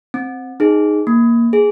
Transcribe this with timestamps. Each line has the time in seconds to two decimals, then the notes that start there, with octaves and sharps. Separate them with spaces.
0.14 C4
0.60 D#4 G#4
1.07 A#3
1.53 G#4